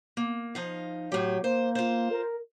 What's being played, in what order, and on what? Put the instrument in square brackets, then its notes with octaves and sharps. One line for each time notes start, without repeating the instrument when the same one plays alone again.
[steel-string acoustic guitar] A#3
F3 D#4 F5
[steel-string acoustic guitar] A2 G4 [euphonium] F#3
[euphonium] A#3 [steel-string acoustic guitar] C5
[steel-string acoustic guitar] F4 C5
[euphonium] A#4